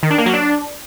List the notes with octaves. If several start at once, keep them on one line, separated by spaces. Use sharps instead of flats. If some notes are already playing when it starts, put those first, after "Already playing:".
D#3
D4
A#3
F#3
D4